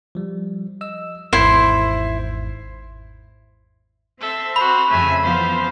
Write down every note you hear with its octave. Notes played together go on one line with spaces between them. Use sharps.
F3 G3
D#5 E6
G#1 E2 G#2 E4 C5
C4 A4 E5
F#4 C5 B5
F2 C#3 A3 E5 G#5
E3 F3 B3 C5 F5